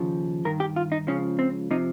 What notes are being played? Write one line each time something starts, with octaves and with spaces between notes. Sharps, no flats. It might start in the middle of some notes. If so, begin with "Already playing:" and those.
Already playing: D#2 C#3 F3
G2 D#3 A#4
G4
F4
D#4
C#2 C#3 F3 C#4
C4
C3 F3 D#4